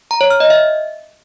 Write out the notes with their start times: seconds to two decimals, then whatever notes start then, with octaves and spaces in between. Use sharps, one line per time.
0.11 A#5
0.21 C#5
0.31 F6
0.40 D#5
0.50 E5